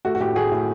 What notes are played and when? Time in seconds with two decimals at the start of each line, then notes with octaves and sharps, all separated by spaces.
0.05 A3 F#4
0.15 F#4
0.20 A2 G4
0.35 A2 F#4 G#4
0.52 A2